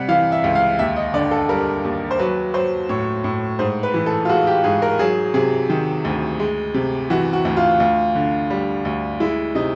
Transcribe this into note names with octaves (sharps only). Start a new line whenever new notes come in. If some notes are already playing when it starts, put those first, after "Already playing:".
Already playing: C3 G3 F#5
E3 F5
E5
C#2
F5
D#2 E5
D#5
D3 D5
A4
G3 A#4
D#2
C5
F#3 B4
F#3 C5
A2 C#5
A2
G#2 C5
B4
E3
A4
F4
G#3 F#4
G4
G#2 G#4
A#4
F#3 G#4
C3 G#4
D#3
D2
G#3
C3
E3 F#4
F#4
D2
F4
D2
D3
G3
D2
G#3 E4
C3 D#4